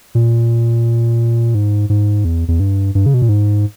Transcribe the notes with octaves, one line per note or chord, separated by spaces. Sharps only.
A#2
G#2
G#2
E2
E2
G2
G2
C#3
B2
A#2
G#2